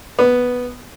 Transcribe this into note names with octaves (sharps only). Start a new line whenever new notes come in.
B3